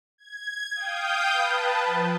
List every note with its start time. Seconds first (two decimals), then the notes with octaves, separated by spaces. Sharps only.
0.18 G#6
0.75 F5 G5 D#6 G6
1.33 B4 A5
1.86 F3